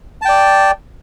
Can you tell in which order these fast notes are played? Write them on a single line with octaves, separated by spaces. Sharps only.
A5 G5 D5